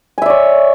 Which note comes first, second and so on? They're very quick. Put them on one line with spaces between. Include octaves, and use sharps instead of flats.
G#5 E5 D5 C#5